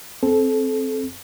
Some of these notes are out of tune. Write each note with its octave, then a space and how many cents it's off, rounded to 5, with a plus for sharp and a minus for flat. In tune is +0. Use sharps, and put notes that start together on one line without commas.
C4 +0 A4 -25